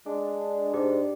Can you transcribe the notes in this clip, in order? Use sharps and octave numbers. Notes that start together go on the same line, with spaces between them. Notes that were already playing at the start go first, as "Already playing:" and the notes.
G#3 D4
G#2 G4